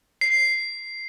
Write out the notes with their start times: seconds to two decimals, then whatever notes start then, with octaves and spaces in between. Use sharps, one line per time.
0.21 C7